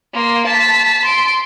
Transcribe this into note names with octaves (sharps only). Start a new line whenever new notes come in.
A#3 C6
A5 B6
C6 D7